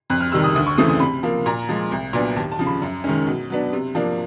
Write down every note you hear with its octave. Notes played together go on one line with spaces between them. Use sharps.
F2 F#6
F6
C3 D#3 G3 E6
D#6
D2 D#6
C#6
C#3 E3 A3 C4 D#6
D#6
C3 B5
F3 A#3
A#2 A#5
F3 G#3
C2
A#2 F#3 B3 D4
D#2 A5
A5
C#3 F3
B5
F#2
D#3 G#3 C#4
B2
F#3 B3 D4
C3
F3 A#3 D4